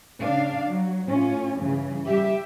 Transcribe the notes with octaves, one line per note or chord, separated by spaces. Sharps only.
C#3 D4 D5 F5
F#3
A2 C#4 F4
G2 C#3 E3
G3 G4 E5